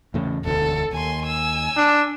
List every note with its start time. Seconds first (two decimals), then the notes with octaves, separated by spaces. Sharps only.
0.14 E2 A2 C#3
0.45 E1 D2 A4
0.93 D#2 G#5 C6
1.23 G#5 E6
1.77 D4